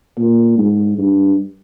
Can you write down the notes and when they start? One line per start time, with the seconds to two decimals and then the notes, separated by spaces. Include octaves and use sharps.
0.18 A#2
0.58 G#2
0.98 G2